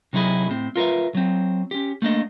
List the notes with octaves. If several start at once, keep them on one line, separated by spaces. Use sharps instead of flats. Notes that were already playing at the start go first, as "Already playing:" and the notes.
C3 F#3 D#4 E4 G#4
A2 C4
F4 A#4 B4 E5
F#3 C4
C#4 G4
A3 A#3 D4 D5 D#5